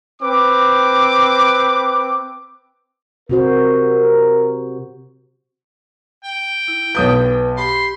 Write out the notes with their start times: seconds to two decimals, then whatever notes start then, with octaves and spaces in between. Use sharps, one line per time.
0.22 C4 B4 D6
3.29 C3 F#4 A#4 C5
6.25 G5
6.68 E4
6.95 B1 B4 D#6 G6
7.58 G4 B5 C6